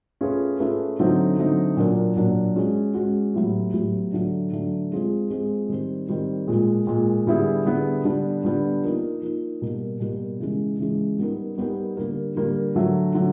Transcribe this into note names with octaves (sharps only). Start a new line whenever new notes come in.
A3 C#4 F4 G#4 B4
A3 C#4 F4 G#4 B4
D3 F#3 A3 C4 D#4
D3 F#3 A3 C4 D#4
A#2 F#3 A#3 D4
A#2 F#3 A#3 D4
G#3 C#4 F#4
G#3 C#4 F#4
A2 F#3 B3 E4 G4
A2 F#3 B3 E4 G4
D3 F#3 A3 D4
D3 F#3 A3 D4
F3 G#3 C4 F4 G#4
F3 G#3 C4 F4 G#4
D#3 G3 C4
D#3 G3 C4
A#2 F3 G#3
A#2 F3 G#3
D3 G3 B3 E4 G#4
D3 G3 B3 E4 G#4
D3 G3 B3 D4
D3 G3 B3 D4
F3 A#3 D#4
F3 A#3 D#4
B2 G3 A#3
B2 G3 A#3
C#3 E3 G#3
C#3 E3 G#3
G3 B3 D#4 G4 A#4
G3 B3 D#4 G4 A#4
D3 G3 A#3
D3 G3 A#3
D3 F#3 A3
D3 F#3 A3